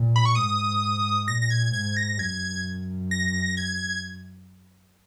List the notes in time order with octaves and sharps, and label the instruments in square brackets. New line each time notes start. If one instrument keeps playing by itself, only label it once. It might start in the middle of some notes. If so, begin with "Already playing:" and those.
Already playing: [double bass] A#2
[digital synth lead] B5
C#6
[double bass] G#2 [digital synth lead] D#6
[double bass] A#2 [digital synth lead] A#6
[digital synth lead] A#6
G#6
[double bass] G#2 [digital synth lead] G#6
[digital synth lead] A#6
[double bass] F#2 [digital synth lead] G#6
[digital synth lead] A#6
G#6